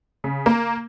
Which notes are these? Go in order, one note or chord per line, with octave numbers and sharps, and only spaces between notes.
C#3
A#3